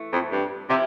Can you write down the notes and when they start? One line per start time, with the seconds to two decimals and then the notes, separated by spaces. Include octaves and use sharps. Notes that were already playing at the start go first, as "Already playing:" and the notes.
Already playing: E3 A3
0.13 F2
0.32 G2
0.70 C3 F3 E4 G4